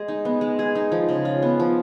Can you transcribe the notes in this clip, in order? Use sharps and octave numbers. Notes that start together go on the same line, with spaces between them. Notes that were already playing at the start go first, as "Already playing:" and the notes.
Already playing: G#3 G#4
D#4
B3
G#3
G#4
D#4
F3
C#3
F4
B3
F3